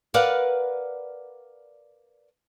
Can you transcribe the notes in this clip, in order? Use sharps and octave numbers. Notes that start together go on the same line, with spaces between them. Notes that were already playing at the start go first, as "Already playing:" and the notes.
A#4 B4 D5 F5 F#5